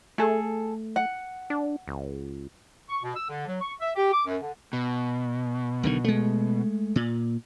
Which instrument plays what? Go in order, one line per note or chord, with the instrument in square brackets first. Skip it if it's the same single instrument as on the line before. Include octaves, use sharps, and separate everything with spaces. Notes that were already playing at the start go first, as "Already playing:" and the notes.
[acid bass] A3 [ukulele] G#4 A4
[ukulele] F#5
[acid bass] D4
C#2
[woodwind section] C#6
B2
E6
D3
F#3
C#6
E5
G4
D6
F#2
D3
[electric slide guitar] B2
[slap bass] B1 D3 D#3
G#3 A3
A#2